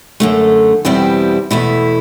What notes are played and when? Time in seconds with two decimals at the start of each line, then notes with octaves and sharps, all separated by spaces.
0.20 F#2 D3 A3
0.85 E2 B2 G3 C4 E4
1.51 E2 B2 A3 E4